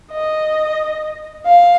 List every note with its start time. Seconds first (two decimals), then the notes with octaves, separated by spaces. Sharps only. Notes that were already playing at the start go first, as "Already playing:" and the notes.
0.12 D#5
1.46 F5